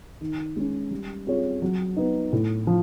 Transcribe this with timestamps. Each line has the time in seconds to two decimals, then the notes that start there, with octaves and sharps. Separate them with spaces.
0.21 D#3
0.56 G#3 C#4
0.91 G3
1.27 C4 F4 G#4 C#5
1.62 F#3
1.96 B3 D#4
2.33 A2
2.67 F3